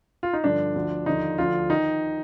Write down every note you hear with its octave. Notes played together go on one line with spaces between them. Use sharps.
F4
D#4
G2 D3 F3 D4
D2 D3 F3
D#2 D3 F3 D#4
D2 D3 F3 F4
D#3 D#4